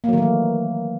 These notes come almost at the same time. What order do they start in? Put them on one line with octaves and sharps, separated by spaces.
A#3 F#3 D#3 A3 E3